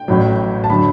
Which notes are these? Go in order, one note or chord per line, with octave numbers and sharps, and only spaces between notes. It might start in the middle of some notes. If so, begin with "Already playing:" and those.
Already playing: G5
A1 A2 F#3
A5
D3 F#3 B5